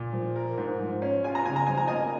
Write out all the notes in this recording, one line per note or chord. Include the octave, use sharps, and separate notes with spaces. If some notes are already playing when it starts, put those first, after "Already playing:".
Already playing: A#2
F3
A#4
G#2
F3
C#4
F4 G#5
A#5
C#3 G#5
A#5
F3 G#5
A#5
A#3 D#5 G#5